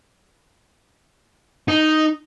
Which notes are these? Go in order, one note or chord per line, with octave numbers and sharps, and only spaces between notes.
D#4